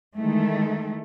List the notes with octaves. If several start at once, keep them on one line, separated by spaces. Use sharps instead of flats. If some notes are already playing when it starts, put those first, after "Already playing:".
D#3 E3 G#3 A3